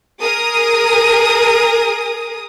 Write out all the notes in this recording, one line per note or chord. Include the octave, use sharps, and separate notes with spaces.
G#4 A#4 D#6